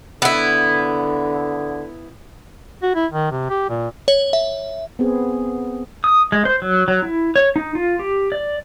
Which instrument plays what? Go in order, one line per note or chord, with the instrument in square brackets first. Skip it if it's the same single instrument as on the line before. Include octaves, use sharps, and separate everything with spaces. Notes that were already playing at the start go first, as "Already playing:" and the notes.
[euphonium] D3 [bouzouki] B3 E4
[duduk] F#4
E4
D#3
C3
G4
A#2
[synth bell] C#5
E5
[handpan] B3 C4 G#4
[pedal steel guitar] D#6
G#3
C5
F#3
F#3
E4
C#5
D#4
F4
G4
D5